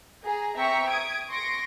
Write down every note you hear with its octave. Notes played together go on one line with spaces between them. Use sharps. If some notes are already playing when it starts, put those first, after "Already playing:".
G#4 A#5
C4 E5 G5 A#5 C#6 B6
D#6 G#6 D7
C6 C#6 A#6 D7